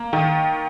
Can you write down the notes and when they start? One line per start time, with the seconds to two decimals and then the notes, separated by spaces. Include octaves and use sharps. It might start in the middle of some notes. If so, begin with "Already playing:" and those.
Already playing: A#3
0.13 D#3